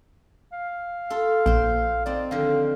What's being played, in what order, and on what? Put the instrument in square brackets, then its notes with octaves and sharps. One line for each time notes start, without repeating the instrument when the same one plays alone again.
[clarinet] F5
[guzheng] F4 A4
[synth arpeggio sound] A#1 [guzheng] C5 G5
[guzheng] C4 D#4 [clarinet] D5
[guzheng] D3 D#3 F3 [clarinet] F5